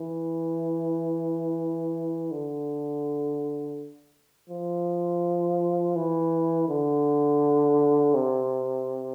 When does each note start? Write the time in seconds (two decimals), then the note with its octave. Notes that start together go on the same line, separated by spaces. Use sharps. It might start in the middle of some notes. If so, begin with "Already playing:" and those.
Already playing: E3
2.32 D3
4.50 F3
5.96 E3
6.68 D3
8.14 C3